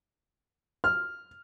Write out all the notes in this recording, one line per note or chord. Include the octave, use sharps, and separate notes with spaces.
F6